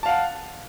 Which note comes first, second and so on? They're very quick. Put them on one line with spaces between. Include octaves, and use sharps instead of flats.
A5 F5 F#5